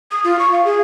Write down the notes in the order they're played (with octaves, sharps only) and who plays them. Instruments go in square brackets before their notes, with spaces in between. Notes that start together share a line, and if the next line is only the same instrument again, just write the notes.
[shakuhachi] D#6
F4
C#6
F5
G#4